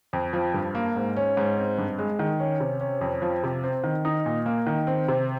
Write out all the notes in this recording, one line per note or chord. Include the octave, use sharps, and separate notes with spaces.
F2
F3
G2
A#3
G#2
C#4
G#2
C4
G2
G#3
D#3
C#4
C3
C#4
F2
F3
C3
C4
D#3
D#4
A#2
A#3
D#3
C4
C3